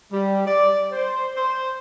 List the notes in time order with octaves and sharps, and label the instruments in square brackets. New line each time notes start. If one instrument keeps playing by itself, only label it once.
[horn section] G3
D5
C5
C5